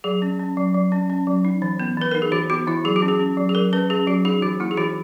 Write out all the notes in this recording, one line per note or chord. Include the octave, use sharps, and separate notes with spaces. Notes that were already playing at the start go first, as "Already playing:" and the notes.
F#3 G#4
C#4
C#4
F#3
F#3
C#4
C#4
F#3
D#4
E3
B3
E3 B4
D#4 A#4
G#4
E3 F#4
B3 F#4
E3 E4
F#3 G#4
F#4
C#4
G#4
C#4
F#3
G#4
F#3 A#4
C#4 B4
C#4 G#4
F#3 F#4
D#4 G#4
E3 F#4
A#3 E4
G#4
E3 F#4